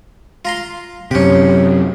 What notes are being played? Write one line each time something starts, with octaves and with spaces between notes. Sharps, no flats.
F4 A#5 C6
F#2 C3 C#4 G4